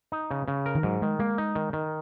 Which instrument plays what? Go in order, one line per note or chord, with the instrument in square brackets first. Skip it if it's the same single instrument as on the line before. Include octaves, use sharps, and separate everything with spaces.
[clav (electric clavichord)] D#4
C#3
C#3
A#4
[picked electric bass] D#3
[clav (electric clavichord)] G#2 [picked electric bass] F#3
[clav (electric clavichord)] D#3 [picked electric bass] G#3
[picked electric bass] G#3 [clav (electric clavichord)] A#3
[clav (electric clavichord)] D#4
D#3
D#3